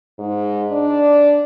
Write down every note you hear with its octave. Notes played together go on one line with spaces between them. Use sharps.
G#2
D4